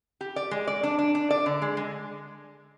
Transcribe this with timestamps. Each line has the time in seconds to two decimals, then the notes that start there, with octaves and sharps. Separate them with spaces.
0.21 G4
0.36 D5
0.51 G#3
0.67 D5
0.83 D4
0.99 D4
1.15 D4
1.30 D5
1.46 D3
1.62 G#3
1.77 G#3